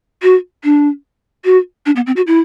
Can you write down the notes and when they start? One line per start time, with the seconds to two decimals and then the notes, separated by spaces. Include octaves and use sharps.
0.22 F#4
0.64 D4
1.45 F#4
1.86 D4
1.96 B3
2.07 C4
2.16 F#4
2.27 E4